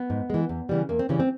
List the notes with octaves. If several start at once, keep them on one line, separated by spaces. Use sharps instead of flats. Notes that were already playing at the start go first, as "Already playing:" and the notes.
Already playing: B3
G#2
E3 G#3
E2
C#3 E3 G3
E2 A#3
C4
C#3 E3 G3 C#4
C4